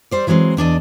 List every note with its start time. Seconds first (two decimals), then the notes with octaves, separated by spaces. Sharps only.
0.11 G3 C5 D5
0.27 E3 F#3 G#3 A#3 C4
0.57 E2 D4 D5 D#5